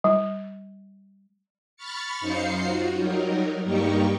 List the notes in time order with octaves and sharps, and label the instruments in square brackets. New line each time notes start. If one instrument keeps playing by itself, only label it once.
[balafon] G3
[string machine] B5 C#6 F6 A6 C#7
F#2 D#4 C5 F5 C7 C#7
F4 F#4
F#3 G3 D#4 A#4
G2 G3 A#3 D#4 G4 C#6